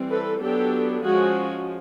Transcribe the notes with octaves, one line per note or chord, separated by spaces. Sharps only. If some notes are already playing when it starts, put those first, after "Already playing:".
Already playing: E3 G3 C4
A4 B4
F#3 B3 D4 G4 A4
F3 G#3 C#4 F#4 G#4